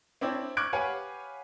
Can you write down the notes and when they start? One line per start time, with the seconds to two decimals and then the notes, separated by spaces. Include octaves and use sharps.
0.21 C4 D4 E4 C#5 D5 G5
0.57 C#6 D6 F6 F#6 G#6 D7
0.73 G4 B4 C#5 F5 F#5 G#5